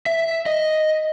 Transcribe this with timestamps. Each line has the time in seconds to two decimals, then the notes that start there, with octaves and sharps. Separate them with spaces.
0.06 E5
0.46 D#5